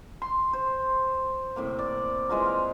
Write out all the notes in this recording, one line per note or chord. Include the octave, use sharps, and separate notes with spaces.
C6
C5
A2 C3 A#3
D5
E3 G#3 F4 A#4
F5